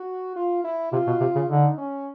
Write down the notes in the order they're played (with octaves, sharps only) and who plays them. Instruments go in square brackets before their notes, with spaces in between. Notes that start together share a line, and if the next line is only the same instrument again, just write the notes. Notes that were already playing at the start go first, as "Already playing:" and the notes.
Already playing: [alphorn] F#4
F4
E4
[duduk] C3 [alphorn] F4
[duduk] B2
C3
C#3
[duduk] D3 [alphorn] D#4
[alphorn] C#4